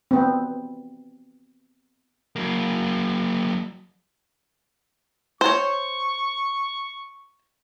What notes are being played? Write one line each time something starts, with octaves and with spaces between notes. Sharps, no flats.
B3 C4
F#3 A#3
C5 C#5 C#6